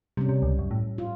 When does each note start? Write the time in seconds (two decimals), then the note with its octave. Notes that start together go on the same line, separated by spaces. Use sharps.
0.17 C3 G3 C#4
0.29 C3
0.42 C#2
0.59 F#2
0.71 A2
0.98 F4